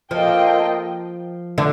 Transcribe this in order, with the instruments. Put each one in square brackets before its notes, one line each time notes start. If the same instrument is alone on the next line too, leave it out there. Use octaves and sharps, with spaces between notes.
[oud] F3 [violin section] A#3 F4 A4 D#5 G5
[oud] D3